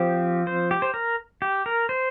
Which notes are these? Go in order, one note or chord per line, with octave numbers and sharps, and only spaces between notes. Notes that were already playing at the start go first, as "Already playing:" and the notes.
Already playing: F3 C4 G4
C5
G4
C5
A#4
G4
A#4
C5